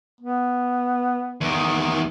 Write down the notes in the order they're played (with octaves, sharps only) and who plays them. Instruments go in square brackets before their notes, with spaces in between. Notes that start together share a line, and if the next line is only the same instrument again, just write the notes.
[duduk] B3
[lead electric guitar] E2 D#3